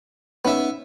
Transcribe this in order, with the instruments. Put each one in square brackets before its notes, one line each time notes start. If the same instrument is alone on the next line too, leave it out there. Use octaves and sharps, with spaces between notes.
[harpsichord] B3 E5 [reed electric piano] C#4 D#4 B4